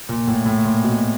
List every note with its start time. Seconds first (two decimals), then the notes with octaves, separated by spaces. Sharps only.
0.09 A#2
0.27 A2
0.46 A2
0.65 A#2
0.84 B2